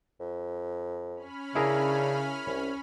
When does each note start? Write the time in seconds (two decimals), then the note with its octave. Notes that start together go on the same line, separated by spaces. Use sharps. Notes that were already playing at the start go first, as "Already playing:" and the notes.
0.20 F2
1.14 C#4 B5 F6
1.55 C#3 D4 E4 G#4 A#4
2.46 C2